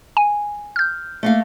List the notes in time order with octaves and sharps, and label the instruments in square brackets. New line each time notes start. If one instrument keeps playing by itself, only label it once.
[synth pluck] G#5
F6 G6
[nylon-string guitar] A3 A#3 F5